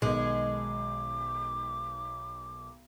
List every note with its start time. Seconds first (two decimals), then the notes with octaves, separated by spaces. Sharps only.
0.02 B1 D#3 G#3 D6